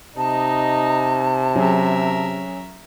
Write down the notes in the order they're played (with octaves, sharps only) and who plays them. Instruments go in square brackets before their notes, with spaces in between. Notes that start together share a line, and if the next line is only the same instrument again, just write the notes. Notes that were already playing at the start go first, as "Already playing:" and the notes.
[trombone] C3 [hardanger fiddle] D#4 D#5 [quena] A5
[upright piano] F#3 C#4 G#4 [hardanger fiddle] A#4 E5